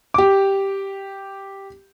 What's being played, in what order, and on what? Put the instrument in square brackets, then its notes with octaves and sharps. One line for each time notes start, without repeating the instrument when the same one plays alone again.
[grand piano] G4 D6